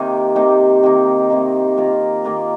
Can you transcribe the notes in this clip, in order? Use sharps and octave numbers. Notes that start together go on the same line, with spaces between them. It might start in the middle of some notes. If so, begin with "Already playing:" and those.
Already playing: C3 D#3 A#3 D#4
C3 D#3 A#3 D#4
C3 D#3 A#3 D#4
C3 D#3 A#3 D#4
D#3 A#3 F4 A#4
D#3 A#3 F4 A#4